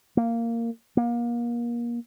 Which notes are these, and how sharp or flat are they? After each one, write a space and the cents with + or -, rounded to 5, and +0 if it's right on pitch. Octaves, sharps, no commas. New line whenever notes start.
A#3 -10
A#3 +30